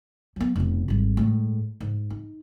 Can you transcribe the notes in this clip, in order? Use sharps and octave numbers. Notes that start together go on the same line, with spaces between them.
F#3 B3
F1 B2
G#1 G3
A2 G#3
G#2
D#4